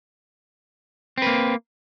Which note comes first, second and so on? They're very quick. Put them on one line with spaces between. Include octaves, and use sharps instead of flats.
C4 B4 A#3